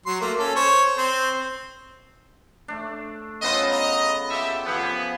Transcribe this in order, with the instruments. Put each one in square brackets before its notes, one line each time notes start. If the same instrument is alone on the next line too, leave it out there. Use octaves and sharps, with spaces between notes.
[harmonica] F#3 C6
A3 A#3
C#4 A4
C5 C#5
C4 C5
[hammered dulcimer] A3 D4
[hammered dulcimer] C#3 B3 F4 [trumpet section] A4 C5 D#5
[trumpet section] D#5 A#5
[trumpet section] G4 E5 [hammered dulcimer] A4
[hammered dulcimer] F3 G4 G#4 [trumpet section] B3